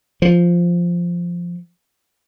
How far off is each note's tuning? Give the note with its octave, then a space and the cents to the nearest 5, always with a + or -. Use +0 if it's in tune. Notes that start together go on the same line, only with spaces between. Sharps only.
F3 -5